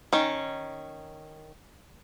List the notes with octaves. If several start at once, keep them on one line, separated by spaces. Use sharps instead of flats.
D#3 C#4